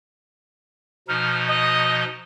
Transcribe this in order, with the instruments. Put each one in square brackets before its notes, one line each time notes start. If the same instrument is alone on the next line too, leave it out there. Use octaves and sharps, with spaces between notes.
[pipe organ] B2 F3 D#4 [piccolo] F6
[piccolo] D#5